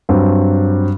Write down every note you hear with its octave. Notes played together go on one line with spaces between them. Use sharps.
G2 F#3 C4